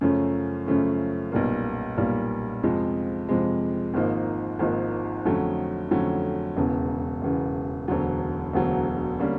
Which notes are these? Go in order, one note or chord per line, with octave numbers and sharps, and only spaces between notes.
F#2 C#3 F3 A3 C#4
F#2 C#3 F3 A3 C#4
B1 A#2 G3 A#3
B1 A#2 G3 A#3
F2 C3 F3 G#3
F2 C3 F3 G#3
G#1 G#2 F3 A#3 D#4
G#1 G#2 F3 A#3 D#4
F2 D3 F#3 A3 C#4
F2 D3 F#3 A3 C#4
E1 E2 C#3
E1 E2 C#3
E1 D2 D3 F#3
E1 D2 D3 F#3
D3 G3 A#3 C#4